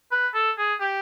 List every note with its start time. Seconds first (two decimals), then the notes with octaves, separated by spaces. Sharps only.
0.12 B4
0.35 A4
0.58 G#4
0.81 G4